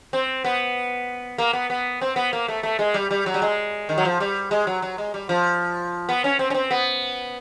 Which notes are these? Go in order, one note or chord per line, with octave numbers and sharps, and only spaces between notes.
C4
B3
A#3
B3
B3
C4
B3
A#3
A3
A3
G#3
G3
G3
F#3
G3
G#3
D#3
F#3
F3
G3
G#3
F#3
F#3
G#3
G3
F3
B3
C#4
C4
C#4
C4
B3